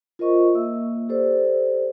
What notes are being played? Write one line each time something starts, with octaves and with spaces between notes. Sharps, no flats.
F4 A#4 C5 D#5 C#6
A#3 E5 E6
G4 A4 C5 D5